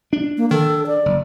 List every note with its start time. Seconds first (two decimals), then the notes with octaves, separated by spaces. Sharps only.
0.13 D4
0.38 A#3
0.51 D#3 A4
0.87 D5
1.06 F#1